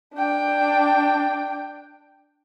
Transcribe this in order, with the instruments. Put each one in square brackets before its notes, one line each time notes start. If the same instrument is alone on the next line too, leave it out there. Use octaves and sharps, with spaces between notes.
[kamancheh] D4 G5